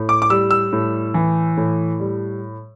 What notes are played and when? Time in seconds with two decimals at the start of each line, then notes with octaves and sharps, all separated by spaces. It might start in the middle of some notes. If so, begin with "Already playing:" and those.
Already playing: A2
0.09 D6
0.22 D6
0.30 G3 E6
0.51 E6
0.73 A2
1.14 E3
1.57 A2
2.00 G3